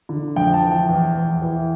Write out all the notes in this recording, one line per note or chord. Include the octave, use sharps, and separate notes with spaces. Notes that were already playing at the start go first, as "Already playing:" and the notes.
D3
F2 G5
A5
E3
G5
E2
E2
E3